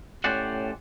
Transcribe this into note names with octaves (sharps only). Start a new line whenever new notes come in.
A2 C#4 G4 C5 D5 F#5